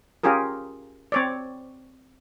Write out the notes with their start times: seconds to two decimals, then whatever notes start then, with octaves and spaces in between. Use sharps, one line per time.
0.23 C#4 F4 G4 G#4 A#4
1.12 C4 C#5 D5